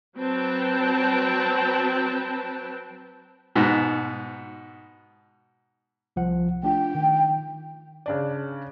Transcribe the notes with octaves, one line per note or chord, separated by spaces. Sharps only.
F#3 C4 B4 G5 A5
G#2 B2
C2 F3 F#5
A3 D4 F4 G5
D#3
C#3 D4 D5